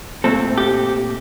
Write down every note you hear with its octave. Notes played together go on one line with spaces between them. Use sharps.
A#2 A3 C4 A4
G4